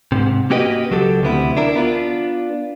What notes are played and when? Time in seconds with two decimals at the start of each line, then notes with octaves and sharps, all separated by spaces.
0.12 G#2 C3
0.50 A#3 C#4 F#4 G4 B4 D#5
0.90 C#2 F#3 G4 A4
1.22 D2 C3 B3 E4
1.57 D4 E4 A#4
1.76 B3 D4 F4